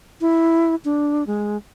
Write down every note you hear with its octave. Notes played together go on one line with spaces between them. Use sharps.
E4
D4
G#3